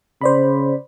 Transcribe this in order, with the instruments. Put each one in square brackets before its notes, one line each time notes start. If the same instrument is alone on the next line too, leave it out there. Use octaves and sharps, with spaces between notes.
[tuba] C#3 [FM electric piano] C5 D5 B5